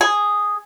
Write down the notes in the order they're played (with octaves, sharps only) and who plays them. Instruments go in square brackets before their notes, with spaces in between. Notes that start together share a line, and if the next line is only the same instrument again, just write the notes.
[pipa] G#4